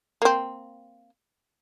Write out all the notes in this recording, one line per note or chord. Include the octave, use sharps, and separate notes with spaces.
A#3 C4